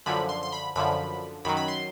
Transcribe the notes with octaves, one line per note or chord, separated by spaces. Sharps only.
F#2 D3 F3 B5
C6
C6
B5
F#2 D3 F3 B5
F#2 D#3 F#3 B5
B5
C6